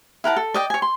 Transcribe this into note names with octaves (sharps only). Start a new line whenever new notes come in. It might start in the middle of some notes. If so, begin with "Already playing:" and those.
E4 A#4 F#5 A5
A4
D5 D#5 G5
C#5 G#5
C6